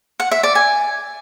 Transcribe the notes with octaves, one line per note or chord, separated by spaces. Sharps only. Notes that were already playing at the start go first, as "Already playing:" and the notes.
F#5
E5
D5
G#5